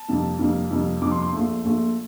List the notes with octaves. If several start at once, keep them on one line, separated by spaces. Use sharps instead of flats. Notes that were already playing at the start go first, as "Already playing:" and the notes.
Already playing: A5
F2 C3 G3 A#3
F2 C3 G3 A#3
F2 C3 G3 A#3
F2 C3 G3 A#3 D6
C6
C6
A#1 A#2 A3
A#1 A#2 A3